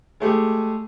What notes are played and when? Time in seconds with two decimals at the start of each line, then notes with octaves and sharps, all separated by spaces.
0.20 G#3 A3 G4 G#4